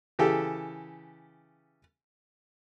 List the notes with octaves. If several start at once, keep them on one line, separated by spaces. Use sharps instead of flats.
C#3 E3 G4 A4